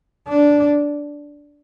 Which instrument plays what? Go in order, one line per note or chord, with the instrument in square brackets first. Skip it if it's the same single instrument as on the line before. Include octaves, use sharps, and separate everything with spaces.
[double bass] D4